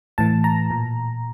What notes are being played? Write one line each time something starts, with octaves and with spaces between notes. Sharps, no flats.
A2 E3 A5
A#5
A#2